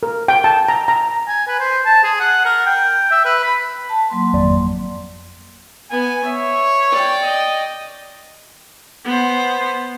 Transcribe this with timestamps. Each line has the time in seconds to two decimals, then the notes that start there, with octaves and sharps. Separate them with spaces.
0.03 A#4
0.28 G5
0.44 A5
0.68 A#5
0.88 A#5
1.28 G#5
1.48 B4
1.59 C5
1.86 A5
2.04 G#4
2.20 F#5
2.46 A#4
2.66 G5
3.11 E5
3.25 B4
3.44 B5
3.89 A5
4.10 F#3 A#3 C6
4.33 G#1 F2 D5
5.91 B3 G#5
6.24 C#5 E5
6.91 D5 G5
7.23 D#5
9.04 B3 C5